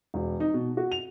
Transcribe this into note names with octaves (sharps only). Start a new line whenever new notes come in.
E1
D#4
B2
F#4
F7